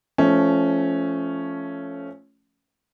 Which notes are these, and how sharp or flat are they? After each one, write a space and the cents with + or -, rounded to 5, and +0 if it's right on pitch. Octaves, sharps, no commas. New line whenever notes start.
F3 -20 A3 -10 C#4 +0